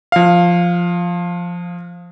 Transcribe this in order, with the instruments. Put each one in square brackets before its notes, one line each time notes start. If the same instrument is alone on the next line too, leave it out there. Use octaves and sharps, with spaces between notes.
[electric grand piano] F3 F5